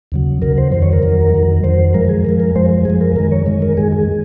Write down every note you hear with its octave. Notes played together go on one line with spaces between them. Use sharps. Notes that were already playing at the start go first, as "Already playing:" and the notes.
D#2 C#3 F#3
D#2 C#3 F#3 A#4
C5
F2 D#3 F#3 C5
C#5
A#4
F2 D#3 F#3
F2 D#3 F#3
F2 D#3 F#3 C5
F#2 F3 G#3 A#4
G#4
F#2 F3 G#3 A#4
A#4
F#2 F3 G#3 C5
F#2 F3 G#3 G#4
A#4
F#2 D#3 G#3 A#4
C#5
F#2 D#3 G#3
A#4
F#2 D#3 G#3 G#4
G#4